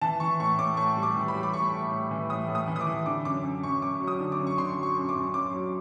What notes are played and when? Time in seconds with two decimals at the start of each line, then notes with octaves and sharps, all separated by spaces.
0.01 E3 A5
0.20 E3 C#6
0.39 A2 C#6
0.58 A2 D6
0.77 A2 C#6
0.97 G3
1.03 D6
1.16 E3
1.28 B5
1.35 G3
1.43 D6
1.54 A2 C#6
1.72 A2
1.92 A2
2.11 E3
2.30 A2 D#6
2.49 A2
2.55 D#6
2.68 E3
2.76 D#6
2.81 D6
2.87 E3
3.06 D3 D6
3.25 F#2 D6
3.43 F#2
3.63 F#2 C#6
3.82 F#2 D6
4.00 F#3
4.08 D#6
4.20 D3
4.32 D6
4.39 F#2
4.47 C#6
4.58 D3 C6
4.77 F#3
4.83 C#6
4.96 F#2
5.09 D6
5.15 F#2
5.34 F#2 D6
5.53 F#3